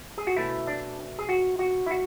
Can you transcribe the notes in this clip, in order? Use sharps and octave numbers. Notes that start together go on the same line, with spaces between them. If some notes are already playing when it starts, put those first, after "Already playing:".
G#4
F#4
B2 A3 C#4 E4
D4
G#4
F#4
F#4
E4
F#4